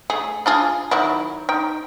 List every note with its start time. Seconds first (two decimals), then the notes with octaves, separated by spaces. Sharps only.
0.10 A3 G#4
0.46 D4 F4 G#4
0.91 D#3 F#3 E4
1.49 D#4 G5